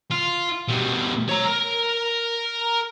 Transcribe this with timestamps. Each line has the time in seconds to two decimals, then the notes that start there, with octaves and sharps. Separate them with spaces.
0.11 F4
0.68 B2 G3
1.29 C#5 A#5
1.46 A#4